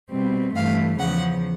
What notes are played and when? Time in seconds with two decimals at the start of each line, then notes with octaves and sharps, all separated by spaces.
0.11 B2 G3 C4
0.55 G2 E3 A3 F5
0.99 E2 C#3 F3 F#5